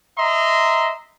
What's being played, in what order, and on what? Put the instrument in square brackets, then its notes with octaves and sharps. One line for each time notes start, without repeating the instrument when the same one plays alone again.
[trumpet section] D#5 E5 A#5 C6